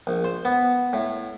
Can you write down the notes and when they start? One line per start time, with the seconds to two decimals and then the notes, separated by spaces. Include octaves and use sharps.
0.07 A#1
0.25 C5
0.45 B3
0.93 A2